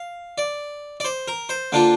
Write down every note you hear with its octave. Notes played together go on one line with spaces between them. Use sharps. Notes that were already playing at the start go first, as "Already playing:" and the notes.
Already playing: F5
D5
D5
C5
A#4
C5
D3 A#3 D4 F4